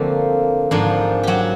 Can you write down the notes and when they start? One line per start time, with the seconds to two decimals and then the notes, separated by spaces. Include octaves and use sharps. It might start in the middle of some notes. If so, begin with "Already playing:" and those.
Already playing: D3 F3 A3 A#3 C4 A#4
0.71 G#2 F3 A#3 D4
1.23 F#3 F#4 G4